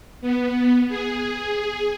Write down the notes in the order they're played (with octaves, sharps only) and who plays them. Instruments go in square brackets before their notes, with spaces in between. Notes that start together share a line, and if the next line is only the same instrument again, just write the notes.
[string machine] B3
G#4